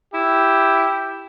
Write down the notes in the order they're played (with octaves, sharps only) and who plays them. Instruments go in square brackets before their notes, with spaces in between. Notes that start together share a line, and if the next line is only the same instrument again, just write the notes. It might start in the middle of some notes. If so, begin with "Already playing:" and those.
[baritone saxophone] E4 [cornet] G4